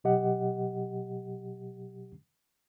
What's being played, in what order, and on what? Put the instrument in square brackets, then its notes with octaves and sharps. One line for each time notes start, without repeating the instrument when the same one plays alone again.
[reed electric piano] B2 F#3 G4 D#5 F#5